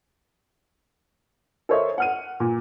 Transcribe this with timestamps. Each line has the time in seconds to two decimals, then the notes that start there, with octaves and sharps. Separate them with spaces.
1.69 A4 A#4 C5 C#5 D#5 E5
1.98 F#5 F6 D#7
2.40 A#2